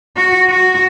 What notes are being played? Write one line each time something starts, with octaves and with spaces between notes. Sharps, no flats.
F#4
F#4